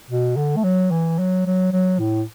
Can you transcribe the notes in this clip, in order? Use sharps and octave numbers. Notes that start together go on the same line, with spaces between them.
B2
D3
A3
F#3
E3
F#3
F#3
F#3
A2